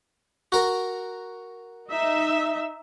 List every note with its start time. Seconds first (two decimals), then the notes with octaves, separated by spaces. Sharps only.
0.52 F#4 A#4
1.91 D#4 E5